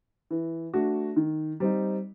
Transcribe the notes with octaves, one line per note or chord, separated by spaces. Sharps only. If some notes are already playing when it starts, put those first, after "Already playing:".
E3
A3 D4 F#4
D#3
G3 C4 D#4